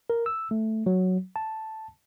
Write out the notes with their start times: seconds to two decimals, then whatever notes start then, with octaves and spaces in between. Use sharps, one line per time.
0.10 A#4
0.26 E6
0.51 A3
0.86 F#3
1.36 A5